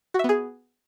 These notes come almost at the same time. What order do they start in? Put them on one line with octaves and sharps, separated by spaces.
F#4 E5 B3 G#4